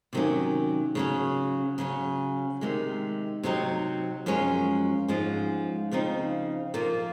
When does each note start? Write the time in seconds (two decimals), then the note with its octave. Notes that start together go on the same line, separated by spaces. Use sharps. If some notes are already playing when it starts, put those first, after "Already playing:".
0.13 C3 D#3 F#3 A#3 C#4
0.95 C#3 F#3 C#4
1.78 C#3 F#3 C#4
2.61 C3 D#3 G#3
3.43 C3 F#3 C4 D#4
4.26 F#2 F3 G#3 C#4
5.08 G#2 F3 G#3 C#4
5.91 C#3 F3 C4 D#4
6.74 A#2 F3 A#3